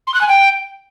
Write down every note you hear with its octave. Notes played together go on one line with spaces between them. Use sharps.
C6
F#6
G#5
G5